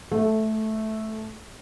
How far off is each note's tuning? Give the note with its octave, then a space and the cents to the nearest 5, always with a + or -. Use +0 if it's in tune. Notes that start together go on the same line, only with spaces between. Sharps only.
A3 -10 A4 +0